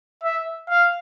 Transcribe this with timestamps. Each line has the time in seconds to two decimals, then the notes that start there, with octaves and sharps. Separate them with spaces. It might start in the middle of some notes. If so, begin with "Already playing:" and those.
0.23 E5
0.70 F5